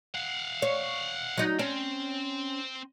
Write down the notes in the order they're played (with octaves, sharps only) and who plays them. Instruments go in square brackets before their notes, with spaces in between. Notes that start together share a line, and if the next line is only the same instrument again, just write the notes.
[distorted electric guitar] F5 F#5
[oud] C#5
F#3 D#4
[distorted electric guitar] C4 [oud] C#4